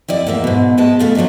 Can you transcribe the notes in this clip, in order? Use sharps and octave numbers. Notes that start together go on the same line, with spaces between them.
F2 E4 D5 D#5
E2 G#2 A#3 E5
G#2 B2
B2 E3 G#3 A5
C#3 A3 F4 G#4
F3 F#3 A3 D4 D#4